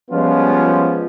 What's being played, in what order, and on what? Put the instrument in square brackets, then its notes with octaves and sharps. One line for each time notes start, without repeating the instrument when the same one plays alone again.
[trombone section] F3 G3 G#3 B3 C#4 F4